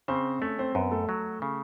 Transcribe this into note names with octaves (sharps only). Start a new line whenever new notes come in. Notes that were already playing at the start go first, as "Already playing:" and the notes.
C#3 C4 C5
A3 C#4 C#5
C4 C5
F#2 B3 B4
A3 A4
F#3
C#3